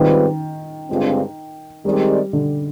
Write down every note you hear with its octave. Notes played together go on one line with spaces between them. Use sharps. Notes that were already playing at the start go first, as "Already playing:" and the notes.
Already playing: G#2 D#3 G3 C4 F4 B4
G2 D3 G#3 C4 F4
D#3 G3 G#3 C4 G4 D5
D3